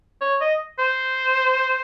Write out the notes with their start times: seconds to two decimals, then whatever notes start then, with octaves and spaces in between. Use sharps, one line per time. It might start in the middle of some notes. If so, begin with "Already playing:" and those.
0.21 C#5
0.41 D#5
0.79 C5